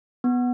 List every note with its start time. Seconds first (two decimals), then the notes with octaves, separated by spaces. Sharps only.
0.24 B3